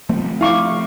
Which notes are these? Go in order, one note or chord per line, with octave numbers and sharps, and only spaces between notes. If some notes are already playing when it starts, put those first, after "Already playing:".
F3 A3 C4
E4 F5 C#6 D6